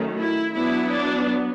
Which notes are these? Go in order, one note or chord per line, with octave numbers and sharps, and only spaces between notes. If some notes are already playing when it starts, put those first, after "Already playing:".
Already playing: D#3 F#3 A3 C#4
E4
F#3 B3 D4 E4
D4